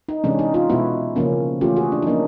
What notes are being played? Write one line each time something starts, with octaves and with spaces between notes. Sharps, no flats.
D#4
C3 E3 G#3 C#4 D4
D#4
D#4 F4
B2 G#3 B3 E4 F#4
C#3 F3 A#3 C#4
E3 A3 C#4 F4 G4
F#4 G#4
D4
D#4
F3 A#3 C#4 D4